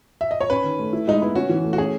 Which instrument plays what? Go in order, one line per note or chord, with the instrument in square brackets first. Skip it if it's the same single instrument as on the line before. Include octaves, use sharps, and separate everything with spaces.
[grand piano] E5
D#5
C#5
[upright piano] C#4 [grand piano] B4
[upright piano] D#3
A3
E4
[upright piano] G#3 [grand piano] D#4
[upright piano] B3 [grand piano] E4
[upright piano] C#4 [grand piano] F#4
[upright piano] E3
A3
[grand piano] F#4
[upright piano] C#4 [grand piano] G#4